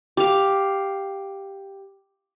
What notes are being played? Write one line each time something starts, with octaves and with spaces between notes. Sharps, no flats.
G4 F5